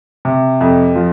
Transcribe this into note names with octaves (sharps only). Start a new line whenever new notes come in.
C3
F2
F3